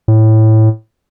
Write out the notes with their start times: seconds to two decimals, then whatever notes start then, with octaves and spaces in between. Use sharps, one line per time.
0.08 A2